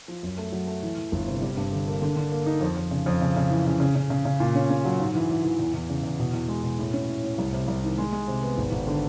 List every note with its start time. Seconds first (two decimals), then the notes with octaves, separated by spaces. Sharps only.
0.08 F3
0.23 F#2
0.38 A3
0.52 F#3
0.67 A3
0.83 E3
0.98 E3
1.12 G1
1.28 C3
1.42 G3
1.57 G2
1.72 D3
1.88 A#3
2.02 D3
2.16 D3
2.32 A#3
2.46 D#4
2.61 F2
2.77 F2
2.91 C#3
3.06 F2
3.21 C#3
3.36 C#3
3.50 E3
3.66 C#3
3.80 C#3
3.95 C#3
4.10 C#3
4.25 C#3
4.40 A#2
4.55 C#4
4.70 C#4
4.85 F#3
5.00 G#2
5.15 E3
5.30 E3
5.45 E3
5.59 E2
5.74 E2
5.90 C#3
6.03 E2
6.19 B2
6.34 E2
6.48 G#3
6.63 B2
6.79 A2
6.93 C#4
7.08 A2
7.23 A2
7.38 C2
7.52 C3
7.68 C2
7.83 D#3
7.98 G#3
8.13 G#3
8.28 C3
8.43 B3
8.58 G#1
8.72 G#1
8.87 D3